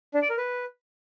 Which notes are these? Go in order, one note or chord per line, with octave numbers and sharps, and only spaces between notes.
D4
D5
A#4
B4